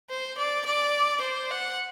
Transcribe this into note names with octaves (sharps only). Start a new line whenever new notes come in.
C5
D5
D5
C5
F#5